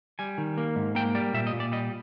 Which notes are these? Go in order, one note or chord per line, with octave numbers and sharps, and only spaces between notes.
G3 G#5
D#3
A#3
G#2
A#3 G5
G3 D5
A#2 E5
D#5
A#2
D5
G3 D#5